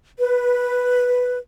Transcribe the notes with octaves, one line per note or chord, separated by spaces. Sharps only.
B4